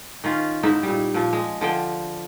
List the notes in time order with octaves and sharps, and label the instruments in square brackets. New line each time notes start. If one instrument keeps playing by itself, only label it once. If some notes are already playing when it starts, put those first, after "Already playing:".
[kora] D#3 C#4 F4
G#2 D#4 E4 E5
A#2 G3
A#2 F3
G#3
D3 F3 G5